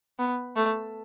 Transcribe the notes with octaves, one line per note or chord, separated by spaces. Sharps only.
B3
A3